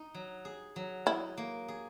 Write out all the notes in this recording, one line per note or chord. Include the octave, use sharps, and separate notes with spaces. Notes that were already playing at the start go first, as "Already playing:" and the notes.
Already playing: D#4
F#3
G#4
F#3
D#4 E4
A#3
G#4